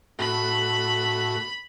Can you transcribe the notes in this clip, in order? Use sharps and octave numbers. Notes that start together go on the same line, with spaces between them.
A2 F#4 B5